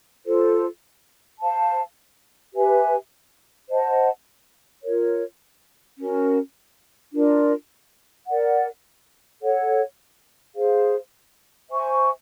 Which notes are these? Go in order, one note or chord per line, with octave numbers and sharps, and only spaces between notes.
F4 A4 C5
C5 F5 A5
G4 B4 E5 G#5
C5 D#5 F#5 A5
F4 A#4 C#5
C#4 F#4 A#4
D4 F4 A#4 D5
A#4 D5 F#5
A4 C#5 F#5
G#4 C5 F5
C5 E5 G#5 C#6